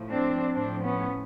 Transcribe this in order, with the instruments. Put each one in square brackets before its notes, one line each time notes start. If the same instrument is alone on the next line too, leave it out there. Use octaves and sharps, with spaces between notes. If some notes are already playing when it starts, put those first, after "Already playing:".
Already playing: [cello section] A2 F3
C4 D4
A2 F3 C4 D4
B3 C#4